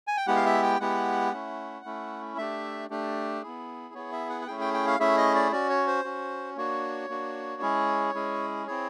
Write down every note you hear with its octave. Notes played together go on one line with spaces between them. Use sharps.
G#5
G5
G#3 B3 E4 G4 F#5
F5
E5
G5
G#3 B3 E4 G4 F#5
A3 C#4 E4
A3 C#4 E4
A3 D4 G4 E5
A3 D4 G4
B3 E4 G#4
B3 E4 G#4 C#5
E5
F#5
F#5
A3 C#4 E4 G#4 G5
G5
G5
F5
A3 C#4 E4 G#4 E5
D#5
D5
C#4 F#4 D5
C#5
C5
C#4 F#4
A#3 D4 F#4 C#5
A#3 D4 F#4
G#3 C#4 E4 G#4
G#3 C#4 E4 G#4
C4 E4 G#4 C#5